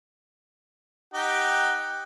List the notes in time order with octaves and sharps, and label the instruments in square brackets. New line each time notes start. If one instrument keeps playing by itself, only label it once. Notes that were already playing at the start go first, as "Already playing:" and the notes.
[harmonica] D#4 G4 G5 [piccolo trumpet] F#5